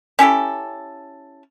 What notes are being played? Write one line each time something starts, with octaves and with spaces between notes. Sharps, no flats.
C#4 E4 G4 A4